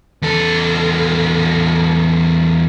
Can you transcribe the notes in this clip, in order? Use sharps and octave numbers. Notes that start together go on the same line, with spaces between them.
E2 A4